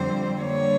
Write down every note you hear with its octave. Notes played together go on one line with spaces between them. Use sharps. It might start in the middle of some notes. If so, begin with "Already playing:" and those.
Already playing: F2 D3 G3 C4 C5
D3 G3 A#3 C#5